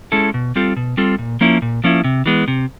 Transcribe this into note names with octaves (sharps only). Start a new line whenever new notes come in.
G#3 C#4 E4 A4
B2
G3 C4 F4 A4
B2
G3 C4 F4 A4
A#2
F3 A#3 C#4 E4
A#2
F3 A#3 C#4 E4
C3
E3 G#3 B3
C3